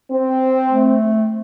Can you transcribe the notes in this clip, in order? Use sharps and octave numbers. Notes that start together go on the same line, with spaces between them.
C4
A3